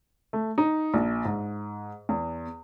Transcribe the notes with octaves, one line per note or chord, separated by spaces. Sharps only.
A3
D#4
A#1
G#2
E2